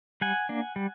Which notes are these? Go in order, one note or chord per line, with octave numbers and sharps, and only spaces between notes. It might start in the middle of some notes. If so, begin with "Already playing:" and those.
G3 F#5 G#5
A#3 D4
G3